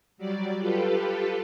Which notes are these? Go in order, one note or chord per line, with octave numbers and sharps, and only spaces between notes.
F#3 G3 D5
F4 G4 A4 B4